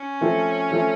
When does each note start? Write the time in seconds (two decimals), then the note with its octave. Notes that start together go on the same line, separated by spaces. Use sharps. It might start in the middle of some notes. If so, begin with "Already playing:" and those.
Already playing: C#4
0.21 F3 A3 C4
0.71 F3 A3 C4